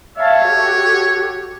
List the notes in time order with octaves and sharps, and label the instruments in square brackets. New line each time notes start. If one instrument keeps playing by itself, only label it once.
[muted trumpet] C#5 [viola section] E5 F5 A5
[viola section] F#4 G4 A4